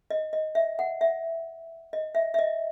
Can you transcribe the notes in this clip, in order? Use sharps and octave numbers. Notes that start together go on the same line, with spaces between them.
D#5
D#5
E5
F#5
E5
D#5
E5
E5
D#5